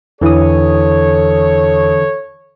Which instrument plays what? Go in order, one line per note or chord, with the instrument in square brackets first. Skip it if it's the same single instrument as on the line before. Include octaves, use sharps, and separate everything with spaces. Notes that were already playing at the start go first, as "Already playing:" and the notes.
[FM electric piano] E2 E4 D#6 [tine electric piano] D3 E3 [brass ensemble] A4 C#5